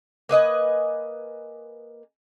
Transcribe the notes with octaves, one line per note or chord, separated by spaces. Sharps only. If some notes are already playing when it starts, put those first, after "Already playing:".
A#3 B4 D#5 G#5